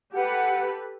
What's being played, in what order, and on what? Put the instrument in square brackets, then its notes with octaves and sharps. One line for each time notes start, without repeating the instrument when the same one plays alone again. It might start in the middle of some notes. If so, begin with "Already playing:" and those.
[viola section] G4 A4 B4 [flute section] F#5